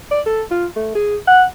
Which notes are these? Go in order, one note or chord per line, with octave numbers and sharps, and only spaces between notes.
D5
A4
F4
A3
G#4
F#5